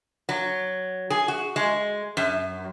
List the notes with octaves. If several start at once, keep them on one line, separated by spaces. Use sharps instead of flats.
F#3
G#4
F#4
G#3
F#2